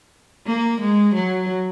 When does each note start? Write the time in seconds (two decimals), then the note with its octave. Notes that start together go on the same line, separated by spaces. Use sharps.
0.47 A#3
0.80 G#3
1.14 F#3